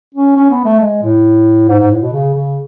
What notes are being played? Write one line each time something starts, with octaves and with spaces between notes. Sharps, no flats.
C#4
C#4
B3
A3
G#3
A2
G#2
G#2
A2
B2
C#3
C#3